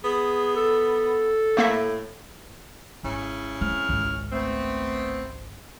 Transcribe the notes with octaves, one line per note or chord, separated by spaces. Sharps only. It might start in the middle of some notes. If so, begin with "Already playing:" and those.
B3 G#4
A4
A2 A3 A#3 E5
G#1 C#3 C#4 E4
C4 F6
G#1 C#2
A3 B3 C4